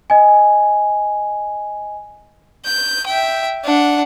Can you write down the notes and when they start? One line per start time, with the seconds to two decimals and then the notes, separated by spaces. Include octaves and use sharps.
0.10 D#5 G#5
2.65 G6
3.07 E5 G5
3.64 D4 F#5